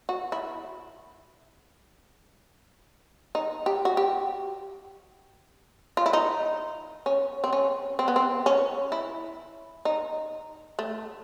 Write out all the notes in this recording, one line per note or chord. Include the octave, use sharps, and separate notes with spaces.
F#4
E4
D#4
G4
F#4
G4
F4
E4
D#4
C#4
C4
C#4
C4
B3
C4
C#4
E4
D#4
A3